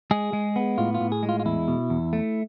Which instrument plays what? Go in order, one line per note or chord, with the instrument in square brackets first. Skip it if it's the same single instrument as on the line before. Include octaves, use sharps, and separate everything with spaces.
[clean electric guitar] G#3 G#4
G#3
B3
A2 F4
F4
A2
G#4
G#3
F4
F4
E2 E4
B2
E2
A3